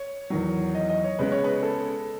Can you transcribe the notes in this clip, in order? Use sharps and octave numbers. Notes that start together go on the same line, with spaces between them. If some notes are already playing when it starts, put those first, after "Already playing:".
Already playing: C#5
E2 D#3 F#3
D#5
D#5
C#5
C#3 G#3 B3 B4
C#5
B4
A4